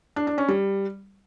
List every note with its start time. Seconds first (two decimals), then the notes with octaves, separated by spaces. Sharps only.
0.16 D4
0.27 D4
0.38 C#4
0.48 G3